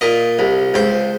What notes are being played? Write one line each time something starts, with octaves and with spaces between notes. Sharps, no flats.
A#2 D#5
C2
C#2 C5